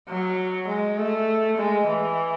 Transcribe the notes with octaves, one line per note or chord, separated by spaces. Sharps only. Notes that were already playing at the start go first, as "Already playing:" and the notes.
F#3
G#3
A3
G#3
E3